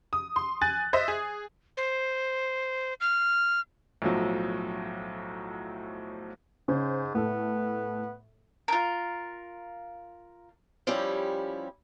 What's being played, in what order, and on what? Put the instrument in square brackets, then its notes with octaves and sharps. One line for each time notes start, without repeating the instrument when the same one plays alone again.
[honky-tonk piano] D#6
C6
G#5 F#6 A6
C5 D#5 E5
G#4
[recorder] C5
F6
[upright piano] B1 A2 F3 F#3
[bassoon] G#2 [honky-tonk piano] C#3 C#4 C5
[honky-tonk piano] A2 A4 [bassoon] B3
[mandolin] F4 A#4
[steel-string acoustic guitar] F3 G3 C#4 E4 G4